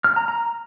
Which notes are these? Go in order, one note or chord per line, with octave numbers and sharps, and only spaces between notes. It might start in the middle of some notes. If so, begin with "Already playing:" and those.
F6
A#5
A#5